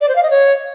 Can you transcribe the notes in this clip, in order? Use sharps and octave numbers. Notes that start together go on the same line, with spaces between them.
D5
C5
F5
D#5
C#5